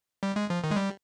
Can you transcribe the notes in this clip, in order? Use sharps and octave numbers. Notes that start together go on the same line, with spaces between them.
G3
G#3
F3
D#3
G#3
G3